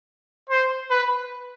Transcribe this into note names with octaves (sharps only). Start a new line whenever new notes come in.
C5
B4